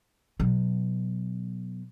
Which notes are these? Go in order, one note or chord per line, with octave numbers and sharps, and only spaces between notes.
B2 F#3